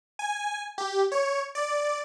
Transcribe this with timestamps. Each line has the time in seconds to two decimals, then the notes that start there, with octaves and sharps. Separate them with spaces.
0.19 G#5
0.78 G4
1.12 C#5
1.55 D5